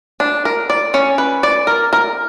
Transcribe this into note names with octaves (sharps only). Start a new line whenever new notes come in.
D4
A#4
D5
C#4
B4
D5
A#4
A#4